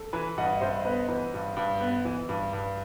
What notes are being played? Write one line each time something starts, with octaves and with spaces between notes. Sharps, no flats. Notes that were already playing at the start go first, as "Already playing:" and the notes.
Already playing: A4
E3 B4
G2 D#5 F#5
D#5
G2 C5 E5
B3 B4 D#5
E3 B4
G2
G2
B3
E3
G2
G2